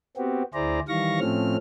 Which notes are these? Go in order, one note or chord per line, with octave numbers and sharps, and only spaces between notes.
B3 C4 F#4 G4
D2 E4 G#4 C5 D5 A#5
D#3 E3 G3 F5 C#6 A#6
A2 F3 A3 C4 C#4 F6